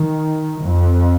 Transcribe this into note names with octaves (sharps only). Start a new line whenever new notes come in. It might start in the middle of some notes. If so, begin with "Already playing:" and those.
Already playing: D#3
F2